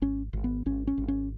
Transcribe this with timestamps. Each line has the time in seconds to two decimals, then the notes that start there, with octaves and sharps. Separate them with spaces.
0.02 G#1 C#4
0.33 G#1
0.44 B3
0.66 G#1 C#4
0.87 C#4
0.98 G#1
1.08 C#4